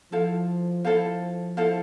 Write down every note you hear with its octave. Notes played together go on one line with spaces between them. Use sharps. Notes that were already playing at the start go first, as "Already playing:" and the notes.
F3 E4 A4 C5 F5
F3 E4 A4 C5 F5
E4 A4 C5 F5